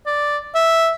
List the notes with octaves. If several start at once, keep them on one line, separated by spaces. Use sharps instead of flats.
D5
E5